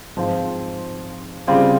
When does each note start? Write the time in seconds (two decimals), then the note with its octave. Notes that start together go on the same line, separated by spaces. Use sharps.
0.17 G#2 F3 C4 F4 C5
1.47 C#3 G3 C4 F4 G#4